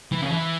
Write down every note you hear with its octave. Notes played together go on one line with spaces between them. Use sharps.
E3
C#3
E3